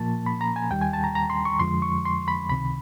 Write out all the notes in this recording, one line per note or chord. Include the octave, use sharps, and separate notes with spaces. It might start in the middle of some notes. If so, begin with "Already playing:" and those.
Already playing: A#2 F3 A#3 A5
B5
A#5
G#5
D#2 D#3 G3 G5
G#5
A5
A#5
A#5
C6
C#6
F2 D3 F3 G#3 C6
C#6
C6
B5
C#2 C3 D#3 B5